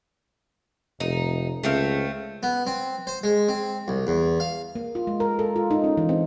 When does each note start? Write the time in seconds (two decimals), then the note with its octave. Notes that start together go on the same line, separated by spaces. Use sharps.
1.00 F1 D#4
1.63 C#2 A3 C4 F5
2.43 B3
2.67 C4
3.07 C5
3.23 G#3
3.49 C4
3.88 C2
4.07 E2
4.40 F5
4.75 A#3
4.95 F4
5.07 G#3
5.20 A#4
5.39 A4
5.56 F4
5.71 D#4
5.84 C#4
5.97 E3
6.09 C4